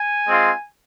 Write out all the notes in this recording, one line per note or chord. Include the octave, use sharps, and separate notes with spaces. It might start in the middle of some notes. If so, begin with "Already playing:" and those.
Already playing: G#5
G#3 C4 F4